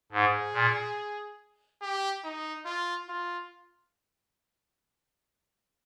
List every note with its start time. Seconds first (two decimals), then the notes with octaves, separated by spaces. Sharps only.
0.12 G#2 G#4
0.54 A#2
1.82 G4
2.24 D#4
2.66 F4
3.09 F4